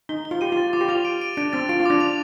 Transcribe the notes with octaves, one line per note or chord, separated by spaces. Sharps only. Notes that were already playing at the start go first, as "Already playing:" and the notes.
D#4 G7
G7
F4
G4 D#7
F4
A6
F4 D6
G4
F4 F7
D7
D7
D4 D7
C4 A6
F4 D7
F4
D4 D6
F7